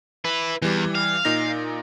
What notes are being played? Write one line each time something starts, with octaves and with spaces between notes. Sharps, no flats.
E4 B4
E2 E3 G3
F5
A#2 D#4 A#6